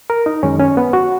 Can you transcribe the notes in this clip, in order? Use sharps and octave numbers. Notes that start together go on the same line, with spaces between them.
A#4
D#4
F#2 D#3 G#3 C#4
C#4
B3
F#4